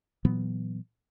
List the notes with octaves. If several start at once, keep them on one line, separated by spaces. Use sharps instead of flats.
A#2 E3 F#3 B3